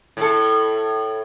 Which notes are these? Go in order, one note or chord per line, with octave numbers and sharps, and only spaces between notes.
A2 A4